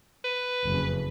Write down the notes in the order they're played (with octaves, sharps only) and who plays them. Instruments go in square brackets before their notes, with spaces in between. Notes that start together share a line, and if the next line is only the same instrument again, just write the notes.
[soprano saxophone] B4
[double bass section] F#1 F2 C#3